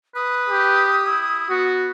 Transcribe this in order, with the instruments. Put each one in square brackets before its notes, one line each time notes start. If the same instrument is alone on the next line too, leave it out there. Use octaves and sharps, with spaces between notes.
[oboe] B4 [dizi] D#6
[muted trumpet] G4
[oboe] E4
[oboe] B3 [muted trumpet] F#4